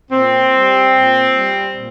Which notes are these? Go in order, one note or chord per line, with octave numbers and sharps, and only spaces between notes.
A#2 C4
G3
A#2
G3
A#2